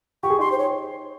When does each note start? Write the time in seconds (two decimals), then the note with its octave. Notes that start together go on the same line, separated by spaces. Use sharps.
0.23 G4 C#6
0.30 G#4
0.39 D#4 G4 C6
0.52 C5
0.59 C#5